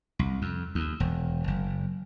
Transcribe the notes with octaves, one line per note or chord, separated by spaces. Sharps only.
C2
F2
D#2
E1
F#1